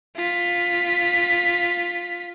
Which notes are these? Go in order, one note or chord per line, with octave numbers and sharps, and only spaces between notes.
F4 B6